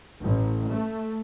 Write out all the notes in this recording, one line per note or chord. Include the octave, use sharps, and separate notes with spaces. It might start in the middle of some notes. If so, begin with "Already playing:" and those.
A1
A3